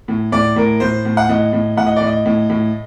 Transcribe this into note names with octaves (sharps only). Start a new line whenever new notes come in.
A2
A2 D5
A2 A#4
A2 C5
A2
F#5
A2 D#5
A2
A2 F#5
D#5
A2 D5
D#5
A2
A2